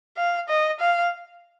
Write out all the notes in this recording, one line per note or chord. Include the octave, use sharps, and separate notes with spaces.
F5
D#5
F5